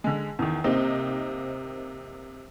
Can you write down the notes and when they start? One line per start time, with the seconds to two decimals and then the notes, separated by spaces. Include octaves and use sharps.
0.04 D3 G#3
0.39 E2 D#3
0.64 C3 A#3 C4 D#4